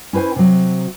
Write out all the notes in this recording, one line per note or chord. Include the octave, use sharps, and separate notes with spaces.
C#4 E4 B4 C5 G#5
C3 F#3